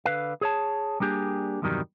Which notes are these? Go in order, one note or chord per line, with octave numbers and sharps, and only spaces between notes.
D3 B4 F5
G#4 C#5 A5
G3 A#3 D4 G4 G#4
E2 G2 C3 D#3 F#3 G3